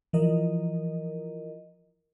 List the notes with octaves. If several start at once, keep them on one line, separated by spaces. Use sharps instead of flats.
E3 F3 A#4 D#5